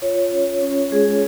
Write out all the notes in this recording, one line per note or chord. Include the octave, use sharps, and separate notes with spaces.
F4 C#5
C#4
C#4
G#3 G#4